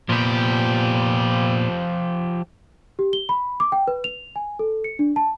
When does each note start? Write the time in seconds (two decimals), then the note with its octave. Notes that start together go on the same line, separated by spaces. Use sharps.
0.09 A#2 F3 B3 G4
2.99 G4
3.13 G7
3.29 B5
3.60 D6
3.72 G5
3.88 B4
4.04 F7
4.36 G#5
4.59 A4
4.84 C#7
4.99 D4
5.16 A5